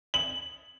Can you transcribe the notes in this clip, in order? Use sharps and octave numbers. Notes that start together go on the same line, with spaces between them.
F#7